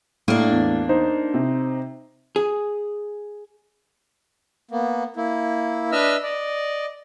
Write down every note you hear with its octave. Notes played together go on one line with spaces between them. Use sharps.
A2 A#3 D4
E2
D#4 C5
C3
G#4
A#3 B3
A#3 E4
D4 B4 D#5 E5 E6 F6
D5 D#5